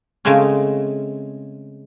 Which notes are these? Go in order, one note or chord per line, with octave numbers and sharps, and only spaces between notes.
C#3 G#3 A3 C4 C#4